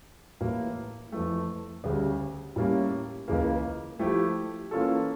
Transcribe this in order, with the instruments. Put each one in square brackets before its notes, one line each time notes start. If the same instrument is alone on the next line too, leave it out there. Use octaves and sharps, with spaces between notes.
[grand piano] A2 E3 A#3
F2 E3 A3
D2 C#3 G3 C#4
A2 G3 A#3 C#4
C#2 C#3 E3 A#3
F3 A3 E4 G4
E3 A#3 C#4 F4 A4